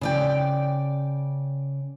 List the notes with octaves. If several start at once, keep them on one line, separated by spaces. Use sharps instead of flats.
C#3 D5 G5